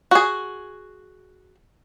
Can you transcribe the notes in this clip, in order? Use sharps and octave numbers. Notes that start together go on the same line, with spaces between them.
F#4 G#4